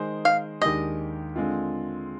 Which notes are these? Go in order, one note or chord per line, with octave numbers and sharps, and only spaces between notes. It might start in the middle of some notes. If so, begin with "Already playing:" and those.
Already playing: D#3 G#3 D#4 G#4 C5
F5
D#2 D#3 G#3 D4 G4 D#5
D3 G#3 C4 F4